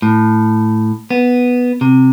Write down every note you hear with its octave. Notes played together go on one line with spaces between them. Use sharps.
A2
B3
C3